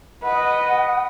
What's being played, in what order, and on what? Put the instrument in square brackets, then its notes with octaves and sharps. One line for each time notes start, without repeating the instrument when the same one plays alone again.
[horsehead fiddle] B4 [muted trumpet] D#5 [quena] F#5